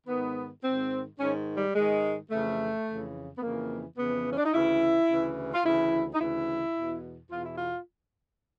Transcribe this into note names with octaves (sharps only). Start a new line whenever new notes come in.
G#2 D#3 B3
G#2 D#3 C4
G#2 D#3 C#4
G3
G#2 D#3 G#3
F2 C#3 E3 A3
F2 C#3 E3
B3
F2 C#3 E3 A#3
F2 C#3 E3 B3
C#4
D4
D#4
D2 C#3 E3 E4
D2 C#3 E3
F4
D2 C#3 E3 E4
D#4
D2 C#3 E3 E4
E2 B2
E2 B2 F4
E4
F4